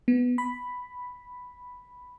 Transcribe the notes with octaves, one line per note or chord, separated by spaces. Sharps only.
B3
B5